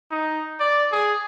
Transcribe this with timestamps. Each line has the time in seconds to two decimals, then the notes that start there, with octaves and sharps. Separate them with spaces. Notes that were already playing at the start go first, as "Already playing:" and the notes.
0.11 D#4
0.60 D5
0.92 G#4